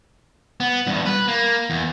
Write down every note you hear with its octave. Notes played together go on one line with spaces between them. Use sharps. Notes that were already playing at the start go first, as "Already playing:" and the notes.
B3
E2 G2
B4
A#3
E2